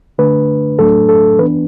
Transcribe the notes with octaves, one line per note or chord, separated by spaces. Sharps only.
D3 A3 D4 B4
A2 F#3 A3 D4 A4
A4
E3 B3 D4 B4